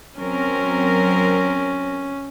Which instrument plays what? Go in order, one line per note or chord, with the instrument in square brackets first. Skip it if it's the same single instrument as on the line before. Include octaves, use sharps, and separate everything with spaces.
[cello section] F#3 C4 A#4 [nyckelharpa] C#4